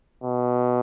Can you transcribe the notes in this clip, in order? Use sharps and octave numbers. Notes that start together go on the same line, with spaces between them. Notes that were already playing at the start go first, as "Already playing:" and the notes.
B2